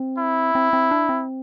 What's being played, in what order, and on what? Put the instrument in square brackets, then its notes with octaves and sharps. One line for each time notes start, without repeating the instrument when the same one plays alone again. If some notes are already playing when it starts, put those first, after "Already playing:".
Already playing: [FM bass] C4
[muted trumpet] E4
[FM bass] C4
C4
D4
C4